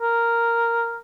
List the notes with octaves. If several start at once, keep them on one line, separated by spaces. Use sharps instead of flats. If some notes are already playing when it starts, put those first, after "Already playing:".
A#4